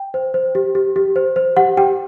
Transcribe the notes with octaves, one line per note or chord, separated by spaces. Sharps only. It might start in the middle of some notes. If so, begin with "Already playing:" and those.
Already playing: G5
C5
C5
G4
G4
G4
C5
C5
G4 F#5
G4 G5